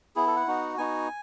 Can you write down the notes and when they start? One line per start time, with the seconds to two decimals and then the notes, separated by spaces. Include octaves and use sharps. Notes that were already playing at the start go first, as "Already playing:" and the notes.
0.16 B3 E4 G#4
0.27 A4
0.36 F#5
0.47 B3 D#4 F#4
0.78 B3 D#4 F#4 G#5